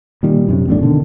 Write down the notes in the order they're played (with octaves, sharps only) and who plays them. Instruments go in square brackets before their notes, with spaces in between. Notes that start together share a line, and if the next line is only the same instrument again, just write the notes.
[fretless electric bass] A#2 D#3 G3
F#2 C3
A#1 E2 A2 D4
B2 D3 D#3